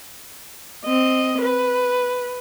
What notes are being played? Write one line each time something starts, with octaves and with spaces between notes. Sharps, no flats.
C4 D#5
B4